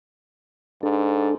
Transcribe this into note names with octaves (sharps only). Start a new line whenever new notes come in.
G#2 D4 A4